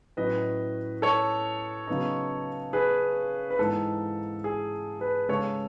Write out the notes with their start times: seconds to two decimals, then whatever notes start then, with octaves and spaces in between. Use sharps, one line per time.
0.17 A2 F#3 C#4 B4 D#5
1.02 A4 C#5
1.87 C#3 F#3 B3 D#4
2.73 G#4 B4
3.50 B4
3.59 G#2 E3 G#3 D#4 A4
4.44 G#4
5.00 G#4 B4
5.29 C#3 G#3 C#4 A4 C#5